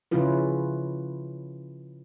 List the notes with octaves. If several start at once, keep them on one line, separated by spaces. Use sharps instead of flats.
C#3 F3 C#4 E4 F4 B4